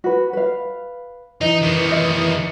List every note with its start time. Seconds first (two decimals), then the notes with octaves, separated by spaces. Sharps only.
0.04 F#4 B4
0.33 B4 F5
1.41 E3 D#4 D#5
1.62 D#3 B3
1.90 D#5 E5